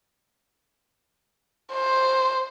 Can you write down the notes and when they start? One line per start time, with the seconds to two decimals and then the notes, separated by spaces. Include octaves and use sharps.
1.73 C5